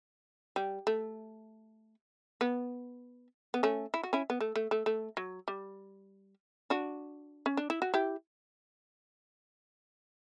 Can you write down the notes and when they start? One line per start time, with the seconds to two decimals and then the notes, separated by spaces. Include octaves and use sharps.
0.56 G3
0.87 A3
2.41 B3
3.54 B3
3.63 A3 C#4
3.94 E4
4.03 F#4
4.13 C#4 E4
4.30 B3
4.40 A3
4.56 A3
4.71 A3
4.86 A3
5.17 F#3
5.48 G3
6.70 D4 F#4
7.46 C#4
7.57 D4
7.70 E4
7.82 F#4
7.94 E4 G4